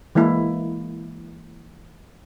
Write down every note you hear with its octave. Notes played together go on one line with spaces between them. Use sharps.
E3 G#3 A#3 E4